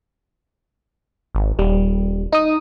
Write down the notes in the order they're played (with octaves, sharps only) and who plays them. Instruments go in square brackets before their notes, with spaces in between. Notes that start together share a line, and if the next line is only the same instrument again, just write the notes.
[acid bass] G#1
[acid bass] D#1 [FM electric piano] G3
[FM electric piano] D#4 D#6